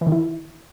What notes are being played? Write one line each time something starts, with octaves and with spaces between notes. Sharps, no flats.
E3
D#3
E4